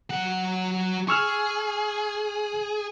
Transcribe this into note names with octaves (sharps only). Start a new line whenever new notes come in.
F#3 F#5
G#4 C#6 E6 F6